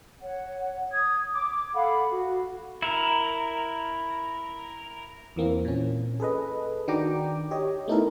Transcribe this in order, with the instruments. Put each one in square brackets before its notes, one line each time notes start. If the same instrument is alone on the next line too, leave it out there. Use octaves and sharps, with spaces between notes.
[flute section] C#5 F#5
D#6 G#6
D6
A4 F5 F#5 B5
F#4
[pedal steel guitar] E4 A#4
[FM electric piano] E2 E3 A#3 C4
A#2 C#4
G#4 A4 B4 D#5
D#3 D4 F#4 G5 A#5 D6
G4 C#5 D#5
A3 B3 D#4 E4 A4 A#4